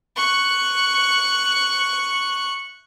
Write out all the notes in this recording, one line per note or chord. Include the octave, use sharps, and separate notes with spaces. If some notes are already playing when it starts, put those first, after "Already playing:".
C#6 F#6